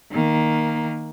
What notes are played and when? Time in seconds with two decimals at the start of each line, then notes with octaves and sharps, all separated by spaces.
0.12 D#3 A#3